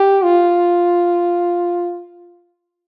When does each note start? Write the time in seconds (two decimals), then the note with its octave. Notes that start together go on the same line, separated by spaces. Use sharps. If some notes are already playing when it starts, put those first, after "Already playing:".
Already playing: G4
0.24 F4